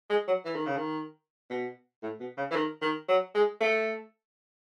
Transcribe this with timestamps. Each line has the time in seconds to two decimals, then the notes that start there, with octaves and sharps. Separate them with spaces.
0.10 G#3
0.27 F#3
0.45 E3
0.55 D#3
0.66 C#3
0.77 D#3
1.50 B2
2.03 A2
2.20 B2
2.37 C#3
2.51 E3
2.55 D#3
2.82 D#3
3.08 F#3
3.34 G#3
3.60 A3